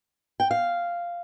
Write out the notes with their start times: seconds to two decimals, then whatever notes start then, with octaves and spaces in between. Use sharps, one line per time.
0.40 G5
0.51 F5